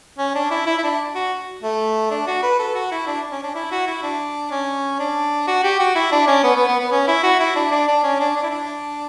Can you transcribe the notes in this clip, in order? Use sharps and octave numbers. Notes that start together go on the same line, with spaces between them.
C#4
D4
E4
E4
E4
D4
F#4
A3
D4
F#4
B4
A4
F#4
E4
D4
C#4
D4
E4
F#4
E4
D4
C#4
D4
F#4
G4
F#4
E4
D4
C#4
B3
B3
B3
B3
C#4
E4
F#4
E4
D4
D4
D4
C#4
D4
D4
E4
D4